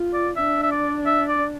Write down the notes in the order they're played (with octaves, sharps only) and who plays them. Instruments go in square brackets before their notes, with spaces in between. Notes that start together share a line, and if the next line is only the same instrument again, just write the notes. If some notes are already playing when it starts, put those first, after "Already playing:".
Already playing: [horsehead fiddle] F4
[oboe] D5
[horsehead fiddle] D4 [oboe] E5
[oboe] E5
D5
E5
D5